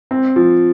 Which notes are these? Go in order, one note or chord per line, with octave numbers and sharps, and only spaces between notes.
C4
F3